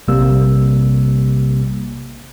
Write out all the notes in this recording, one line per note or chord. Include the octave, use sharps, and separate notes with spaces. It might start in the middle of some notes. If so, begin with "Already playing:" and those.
A#1 C3 G3 A#3 E6